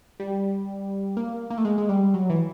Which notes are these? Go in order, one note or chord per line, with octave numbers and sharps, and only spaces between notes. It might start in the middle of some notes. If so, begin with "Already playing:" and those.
G3
A#3
A#3
A3
G#3
G#3
G3
F#3
E3